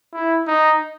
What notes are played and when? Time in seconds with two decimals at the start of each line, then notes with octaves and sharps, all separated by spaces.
0.14 E4
0.47 D#4